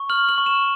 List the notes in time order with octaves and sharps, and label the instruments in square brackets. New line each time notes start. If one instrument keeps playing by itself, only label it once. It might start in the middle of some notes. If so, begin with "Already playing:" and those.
Already playing: [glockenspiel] C#6
F6 F#7
F#7
C#6
E7